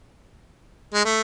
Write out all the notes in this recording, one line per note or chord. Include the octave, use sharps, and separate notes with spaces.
G#3
A3